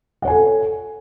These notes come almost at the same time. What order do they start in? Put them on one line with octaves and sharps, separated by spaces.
F#5 C#5 G#5 A4